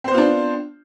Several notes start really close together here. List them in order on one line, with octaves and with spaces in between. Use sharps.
C4 C5 B3 F4 D4